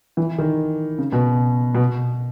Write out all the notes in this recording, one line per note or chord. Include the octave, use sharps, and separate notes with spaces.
E3
D#3
C#3
B2
B2